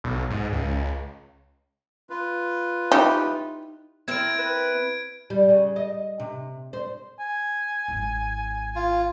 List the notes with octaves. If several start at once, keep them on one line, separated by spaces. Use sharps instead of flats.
B1
G#2
C#2
F4 B4
D#4 E4 G4
C4 E4 A#4 G#6 D7
B4
G3
C#3
D#5
C3
C5
G#5
G#1 E4
F4